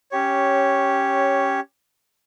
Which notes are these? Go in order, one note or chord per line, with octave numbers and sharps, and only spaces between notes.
C#4 G4 C#5